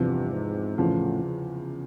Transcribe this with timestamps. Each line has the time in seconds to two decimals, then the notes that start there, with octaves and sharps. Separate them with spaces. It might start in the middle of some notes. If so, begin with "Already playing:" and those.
Already playing: E2 G2 C3 F3
0.32 G#2
0.78 E2 A2 C#3 F3
1.24 C#3